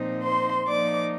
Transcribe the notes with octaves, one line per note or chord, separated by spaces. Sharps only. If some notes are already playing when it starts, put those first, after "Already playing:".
Already playing: A#2 F3 C4 D#4
C5 C6
F3 A#3 D#4 D5 D6